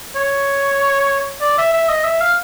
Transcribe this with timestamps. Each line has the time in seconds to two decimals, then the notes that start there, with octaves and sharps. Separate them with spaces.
0.15 C#5
1.41 D5
1.58 E5
1.73 E5
1.89 D#5
2.04 E5
2.21 F5